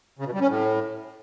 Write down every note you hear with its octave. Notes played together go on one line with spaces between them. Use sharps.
C#3
B2
G3
C#4
A2